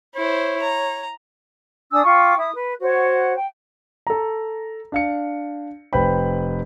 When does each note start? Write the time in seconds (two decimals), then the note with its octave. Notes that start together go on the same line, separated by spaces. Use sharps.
0.15 E4 C5 C#5
0.62 A#5
1.92 D4 G#5 D#6 E6
2.04 F4 G5 C#6 D6
2.37 E4 D#6
2.54 B4
2.81 F#4 C5 C#5 F#5
3.35 G5
4.07 A4 A#5
4.92 D4 F5 C#7
5.93 F1 B4 C5 G5 B5